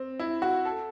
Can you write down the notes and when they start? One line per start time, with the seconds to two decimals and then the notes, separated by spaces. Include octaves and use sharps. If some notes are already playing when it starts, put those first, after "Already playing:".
Already playing: C4
0.20 E4
0.42 F#4
0.65 A4